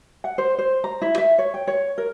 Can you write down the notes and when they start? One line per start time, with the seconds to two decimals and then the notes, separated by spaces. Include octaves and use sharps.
0.24 F#5
0.38 C5
0.58 C5
0.84 A#5
1.02 E4
1.18 E5
1.38 C#5
1.54 G5
1.67 C#5
1.98 A#4